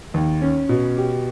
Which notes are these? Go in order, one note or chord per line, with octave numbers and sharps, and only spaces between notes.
D#2
C#4
B2
G4